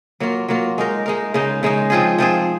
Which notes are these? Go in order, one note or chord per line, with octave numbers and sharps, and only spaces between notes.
F#3 A#3 F4
F#3 A#3 F4
G#3 D#4 A#4
G#3 D#4 A#4
C#3 G#3 D#4
C#3 G#3 D#4
F3 C4 F4 G#4
F3 C4 F4 G#4